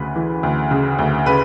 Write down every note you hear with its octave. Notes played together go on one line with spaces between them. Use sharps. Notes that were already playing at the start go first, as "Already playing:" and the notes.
Already playing: D2 C#3 B4
E3
D2
C#3
D2
C#3 B4